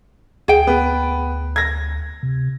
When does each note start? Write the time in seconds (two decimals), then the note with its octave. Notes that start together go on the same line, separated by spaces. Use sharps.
0.48 D2 G#4 G5
0.67 B3
1.56 G#6 A#6
2.23 C3